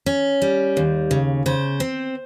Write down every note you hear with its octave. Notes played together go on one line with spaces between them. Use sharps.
C#4
G3
D#2
C#3
C#3 C5
C4